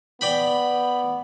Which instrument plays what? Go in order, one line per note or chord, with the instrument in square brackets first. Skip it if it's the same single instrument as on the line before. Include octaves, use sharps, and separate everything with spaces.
[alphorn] B3 [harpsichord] D5 G5 B5